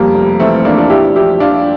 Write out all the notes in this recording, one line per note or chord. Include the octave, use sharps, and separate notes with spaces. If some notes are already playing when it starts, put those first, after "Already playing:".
Already playing: F2 G3 A#3
F1
E3 A3 C4
E3 A#3 D4
D4 F4
A#1 E4 G4
F3 E4 G4
F3 D4 F4